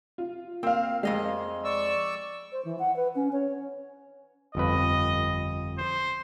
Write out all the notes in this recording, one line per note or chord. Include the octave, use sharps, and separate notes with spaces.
F4
A#3 C4 F5
F2 G#3 A#3 D#5 F5
D5 C#6 E6
C5
E3
F#5
B4
C#4
C#5
G1 F2 B4 D#5
C5